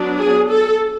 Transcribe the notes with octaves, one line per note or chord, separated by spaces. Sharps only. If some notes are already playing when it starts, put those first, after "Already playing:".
Already playing: F#3 B3 D4
G#4
A4